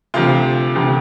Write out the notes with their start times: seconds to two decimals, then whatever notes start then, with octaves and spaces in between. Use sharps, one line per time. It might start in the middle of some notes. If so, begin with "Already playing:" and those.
0.14 D2 C3 F3 F4
0.75 D2 C3 F3